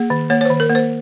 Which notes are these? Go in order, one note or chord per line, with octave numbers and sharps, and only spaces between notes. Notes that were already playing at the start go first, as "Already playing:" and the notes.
Already playing: A#3 G#4
D#3
A#3 C#5
C#5
D#3 C5
A#4
A#3
C5